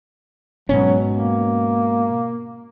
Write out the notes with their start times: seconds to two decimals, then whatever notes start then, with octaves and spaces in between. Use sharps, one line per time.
0.69 G#2 B2 F#3 C#4
1.13 A#3